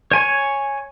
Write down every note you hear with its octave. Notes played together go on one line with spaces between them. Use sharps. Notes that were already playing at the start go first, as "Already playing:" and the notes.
C#5 G#5 C#6